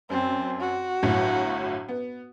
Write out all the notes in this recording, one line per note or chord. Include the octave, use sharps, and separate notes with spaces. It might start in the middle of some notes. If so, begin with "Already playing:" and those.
F#2 C4
F#4
G1 A2 F#3
B3